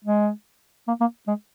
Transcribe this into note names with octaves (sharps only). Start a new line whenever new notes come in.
G#3
A#3
A#3
G#3